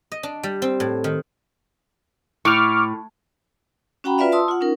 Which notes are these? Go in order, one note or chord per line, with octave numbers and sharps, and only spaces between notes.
D#5
D4
G3
C4
A2
D#3
A2 C#6 D6 F6
C#4 F#4 F#5 G5 A#5 B5
F4 B4 D5 E5 F5
A5 C6 D#6 E6
F4 F#5
C#4 D#4 A#4